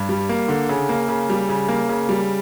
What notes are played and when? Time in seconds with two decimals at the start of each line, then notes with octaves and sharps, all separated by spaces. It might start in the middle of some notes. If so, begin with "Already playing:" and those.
Already playing: G2
0.09 G3
0.29 A#3
0.48 D3
0.69 C#3
0.89 A#3
1.09 C#3
1.29 G3
1.49 C#3
1.68 A#3
1.89 C#3
2.09 G3